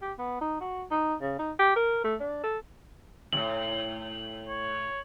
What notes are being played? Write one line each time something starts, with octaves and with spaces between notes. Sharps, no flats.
G4
B3
D#4
F#4
D#4
C#3
D#4
G4
A#4
A3
D4
A4
D#2 A2 F#7
C#5